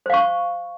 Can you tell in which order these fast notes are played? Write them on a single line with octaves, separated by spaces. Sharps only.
C5 F5 C#6